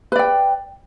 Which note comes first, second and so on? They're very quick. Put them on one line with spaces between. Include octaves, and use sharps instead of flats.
B4 D5 G5